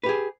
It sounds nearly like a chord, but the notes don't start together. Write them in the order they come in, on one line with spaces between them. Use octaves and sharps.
B4 G4 G#4